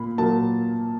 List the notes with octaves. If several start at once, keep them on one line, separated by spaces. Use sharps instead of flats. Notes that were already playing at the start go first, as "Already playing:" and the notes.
Already playing: A#2 A#3 B5
A#2 F#3 A#3 A5